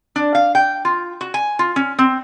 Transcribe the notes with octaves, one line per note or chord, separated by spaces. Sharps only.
D4
F5
G5
F4
F#4
G#5
F4
C#4
C4